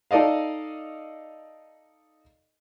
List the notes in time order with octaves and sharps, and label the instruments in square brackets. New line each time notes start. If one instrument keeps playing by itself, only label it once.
[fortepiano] D#4 A4 D5 D#5 F5